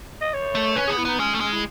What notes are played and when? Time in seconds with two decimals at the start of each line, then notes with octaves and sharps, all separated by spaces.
0.21 D#5
0.33 C#5
0.55 A3
0.76 C#4 B4
0.87 B3 G#4
0.98 E4
1.05 B3 D#4
1.19 G#3 C#4
1.35 A3
1.40 G#3 C#4
1.53 E4